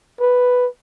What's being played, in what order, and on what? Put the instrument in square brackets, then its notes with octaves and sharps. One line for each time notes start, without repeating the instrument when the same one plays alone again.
[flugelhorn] B4